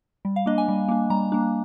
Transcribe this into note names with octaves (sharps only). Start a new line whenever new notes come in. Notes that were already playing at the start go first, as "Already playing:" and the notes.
G3
F5
A#3 D4 D#5
G#5
G3
A#3 D4
G3 A#5
A#3 D4